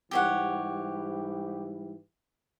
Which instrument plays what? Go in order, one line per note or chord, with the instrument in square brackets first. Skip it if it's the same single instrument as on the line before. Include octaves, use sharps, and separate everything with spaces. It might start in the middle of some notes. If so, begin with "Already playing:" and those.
[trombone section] G#2 E3 G3 [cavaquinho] G4 C#5 F#5